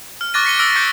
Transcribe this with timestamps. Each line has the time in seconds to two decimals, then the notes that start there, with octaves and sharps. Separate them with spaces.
0.21 F6
0.34 C#6 D6 F#6 A6 A#6 D#7
0.45 B6 C#7 D#7 G7
0.59 E6 F6 A#6 D7
0.76 D6 G6 A#6 C#7